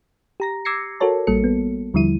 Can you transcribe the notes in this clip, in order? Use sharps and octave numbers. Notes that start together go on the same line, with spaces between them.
G4 A#5 A#6
D6 E6 G#6 A#6 C7 C#7
F#4 A4 A#4 C#5 A5
A1 G3 A#3 A4 C#7
B3
D#2 D3 F3 G3 E4 D#7